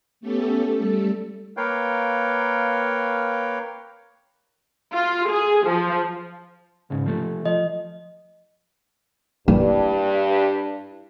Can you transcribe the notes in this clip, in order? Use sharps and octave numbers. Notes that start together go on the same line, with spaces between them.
A3 B3 C#4 G4 A4
G3 A3 A4
A#3 A#4 B4 C#5 F5 G5
F4
G#4
F3
C#2 G#2 C#3
F3 A3
F3 D#5
G2 G3 A#3 E4